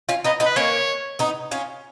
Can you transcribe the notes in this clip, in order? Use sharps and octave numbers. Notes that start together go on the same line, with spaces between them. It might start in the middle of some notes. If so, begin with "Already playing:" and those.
C#4 F4
B3 D#4 D#5
B3 D#4
B4
A#3 C#4 C#5
B3 D#4
C#4 F4